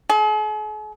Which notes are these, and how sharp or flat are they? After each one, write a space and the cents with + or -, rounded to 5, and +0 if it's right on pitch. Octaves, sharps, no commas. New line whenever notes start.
G#4 +45